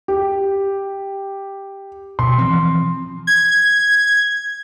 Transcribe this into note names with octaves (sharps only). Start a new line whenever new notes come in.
G4
B2 C6
E3 F3 C4
G#6